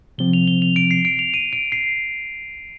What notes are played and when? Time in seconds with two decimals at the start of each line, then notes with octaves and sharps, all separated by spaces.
0.18 C3 F3 C4 G7
0.33 F7
0.48 G7
0.62 F7
0.76 D7
0.91 C7
1.05 D7
1.19 F7
1.34 D#7
1.53 D7
1.72 C7